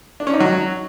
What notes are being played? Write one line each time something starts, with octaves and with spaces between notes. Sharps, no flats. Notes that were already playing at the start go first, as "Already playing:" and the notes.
D4
C#4
D#4
F#3